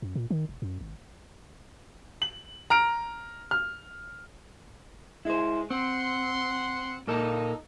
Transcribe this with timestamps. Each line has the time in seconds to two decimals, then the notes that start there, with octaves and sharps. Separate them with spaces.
0.02 F#2
0.15 A#2
0.30 D#3
0.49 E1
0.62 F#2
0.81 G#1
2.22 F#7
2.70 A#5 F6 D7
3.51 F6
5.25 G#3 E4 C5
5.70 C4 F#5 C6
7.07 A#2 A#3 D#4 A4